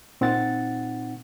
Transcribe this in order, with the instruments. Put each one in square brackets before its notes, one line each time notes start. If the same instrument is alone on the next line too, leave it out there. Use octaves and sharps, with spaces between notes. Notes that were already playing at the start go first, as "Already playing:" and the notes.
[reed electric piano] A#2 C4 D#4 F#5 A6